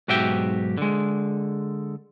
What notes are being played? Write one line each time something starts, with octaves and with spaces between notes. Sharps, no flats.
B1 G#2 F#4 G4 E5 G5
D3 G#3